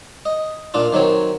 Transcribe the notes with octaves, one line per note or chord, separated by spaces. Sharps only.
D#5
A#2 D4 F4
D#3 F#3 C4 C#5